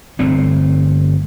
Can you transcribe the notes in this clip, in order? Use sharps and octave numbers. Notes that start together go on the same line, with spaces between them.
G1 A3 C4